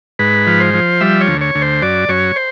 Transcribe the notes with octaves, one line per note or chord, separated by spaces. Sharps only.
G#2 B4
F3
C5
F3
G3 E5
C#5
D2
C#5
D2
C5
F#2 D5
F#2 C#5
C5